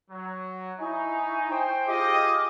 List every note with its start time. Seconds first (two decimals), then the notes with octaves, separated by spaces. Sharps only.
0.11 F#3
0.79 D#4 E4 G#5 C#6
1.50 C5 G5
1.86 F4 G4 G#4 D#5 D6